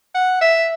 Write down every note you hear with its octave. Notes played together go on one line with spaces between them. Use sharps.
F#5
E5